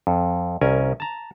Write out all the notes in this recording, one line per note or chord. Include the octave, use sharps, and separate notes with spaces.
F2
C2 C#4 A#4 G#5
A5 A#5